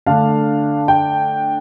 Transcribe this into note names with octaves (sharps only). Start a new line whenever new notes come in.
D3 A3 D4 F5
G5